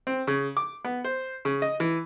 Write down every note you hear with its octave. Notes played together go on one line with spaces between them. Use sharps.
C4
C#3
D6
B3
C5
C#3
D#5
E3